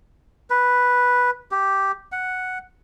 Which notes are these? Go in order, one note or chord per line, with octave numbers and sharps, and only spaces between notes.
B4
G4
F#5